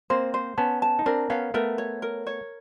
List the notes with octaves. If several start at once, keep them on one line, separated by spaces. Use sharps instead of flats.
A#3 C4 C5
C5
B3 C#4 A5
A5
D#4
C4 D4 A#4
B3 C#4 F5
A3 B3 A#4
C#5
A#4
C#5